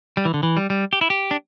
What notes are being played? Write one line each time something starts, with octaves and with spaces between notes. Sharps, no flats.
G3
E3
D3
E3
G3
G3
G4
E4
G4
D4